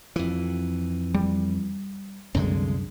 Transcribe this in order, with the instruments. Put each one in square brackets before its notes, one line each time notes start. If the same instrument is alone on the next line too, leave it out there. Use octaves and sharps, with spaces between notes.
[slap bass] F2 E3
[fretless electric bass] G3
[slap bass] C2 D3 G#3 [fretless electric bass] F#2